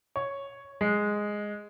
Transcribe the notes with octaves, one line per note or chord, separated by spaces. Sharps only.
C#5
G#3